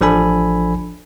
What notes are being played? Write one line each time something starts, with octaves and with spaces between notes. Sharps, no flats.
A1 F3 D4 A4 G#5 B5